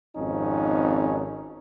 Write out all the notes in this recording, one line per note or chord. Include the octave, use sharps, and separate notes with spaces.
G#1 F2 C#4 D#4